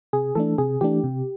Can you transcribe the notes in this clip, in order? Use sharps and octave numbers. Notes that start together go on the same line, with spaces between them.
C3 G#4
E3 A3 D4 A4
C3 G#4
E3 A3 D4 G4
C3